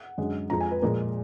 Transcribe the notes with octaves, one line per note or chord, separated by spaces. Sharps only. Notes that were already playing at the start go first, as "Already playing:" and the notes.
Already playing: F#5
F#2 D3 G#3
F2 F3 G#3 A#5
G#5
B4
A#2 F3 G#3 A#4